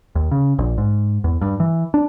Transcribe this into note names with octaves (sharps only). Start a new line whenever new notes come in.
D#2
C#3
A#1
G#2
E2
G2
E3
D4